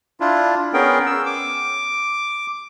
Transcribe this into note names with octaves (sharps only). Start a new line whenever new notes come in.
D4 E4 F4
B3 C#4 G#4 A#4 G5
E6
D6